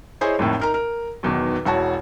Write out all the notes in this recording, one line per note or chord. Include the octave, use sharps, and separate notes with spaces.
E4 G#4 C5 C#5 D#5
G#1 F2 A2
D#4 A#4 A#5
A#4
B1 E2 B2 D#3
E1 E4 F#4 C#5 A5